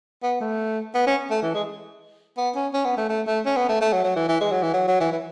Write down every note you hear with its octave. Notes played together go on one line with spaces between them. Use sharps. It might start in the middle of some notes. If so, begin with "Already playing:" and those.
B3
A3
B3
C#4
A3
E3
G#3
B3
C#4
C#4
B3
A3
A3
A3
C#4
B3
A3
A3
F#3
F#3
E3
E3
G#3
F#3
E3
F#3
F#3
E3
E3